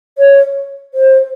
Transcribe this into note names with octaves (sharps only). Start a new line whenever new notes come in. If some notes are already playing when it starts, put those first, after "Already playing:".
C#5
C5